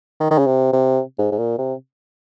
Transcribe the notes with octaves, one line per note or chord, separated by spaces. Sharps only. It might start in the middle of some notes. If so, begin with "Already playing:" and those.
D#3
D#3
C#3
C3
C3
G#2
G#2
A#2
C3